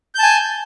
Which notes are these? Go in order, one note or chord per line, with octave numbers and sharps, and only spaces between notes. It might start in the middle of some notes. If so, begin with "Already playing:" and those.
G#5 A5 G6